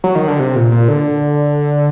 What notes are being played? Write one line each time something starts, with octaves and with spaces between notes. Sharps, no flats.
F#3
D#3
D3
C3
A#2
A#2
D3